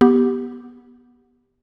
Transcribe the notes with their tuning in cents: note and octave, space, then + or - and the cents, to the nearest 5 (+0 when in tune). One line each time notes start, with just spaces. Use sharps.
B3 -15 G4 +0